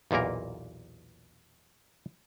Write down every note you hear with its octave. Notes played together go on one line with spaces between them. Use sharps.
B1 E2 A#2 A#3 A#4